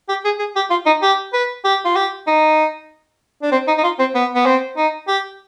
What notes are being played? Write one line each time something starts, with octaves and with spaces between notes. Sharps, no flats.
G4
G#4
G#4
G4
F4
D#4
G4
B4
G4
F4
G4
D#4
D4
C4
D#4
D#4
F4
C4
B3
B3
C4
D#4
G4